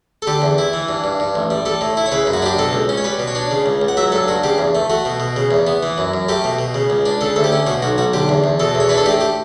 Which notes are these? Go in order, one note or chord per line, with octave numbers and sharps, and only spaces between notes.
A4
D3 G4
E2
E4
E3
G2
G2
G2
A1
G3
G3 A4
A2
E4
C#5
C#3 B4
F#2
F#4
D4 G4
B2 A4
C#2
C#4
C#5
G3 B4
B2
C#5
D4
C#3
C#2
C#2
F#5
F#3 E5
G2 A4
G2 F#4
C#3 G4
E2
A3
A3 F#4
B2
B2
C#3
E2
B3
E3
F#2
F#2
A3 G4
B2
B2
C#3
C#2
D4
C#3 A4
D2 A4
G4
C#4
B2 F#4
B1 F#4
B1 F#4
D3 G4
E2
E2
B2 A4
E2
C#5
D4 B4
A4
A2 G4
G4